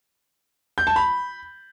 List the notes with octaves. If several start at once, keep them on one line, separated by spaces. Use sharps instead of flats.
G6
A5
B5